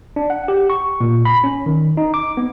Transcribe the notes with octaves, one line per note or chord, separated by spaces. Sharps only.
D4
F#5
G4
C#6
A#2
B5
C#4
D#3
D#4
D6
B3